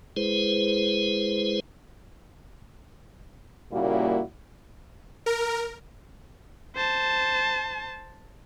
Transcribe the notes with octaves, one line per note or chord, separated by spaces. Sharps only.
G#3 E4 G#4 B4 C5
A#2 C#3 G3 A#3 E4 F#4
A#4
C5 A5